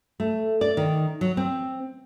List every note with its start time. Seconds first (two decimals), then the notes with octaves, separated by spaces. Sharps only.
0.20 A3
0.61 D5
0.77 D#3
1.21 F#3
1.37 C4